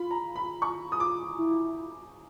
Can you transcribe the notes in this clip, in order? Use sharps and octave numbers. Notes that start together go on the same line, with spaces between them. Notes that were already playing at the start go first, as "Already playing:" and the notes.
Already playing: F4 B5
A#5
B5
C#6
D#6
D6
E4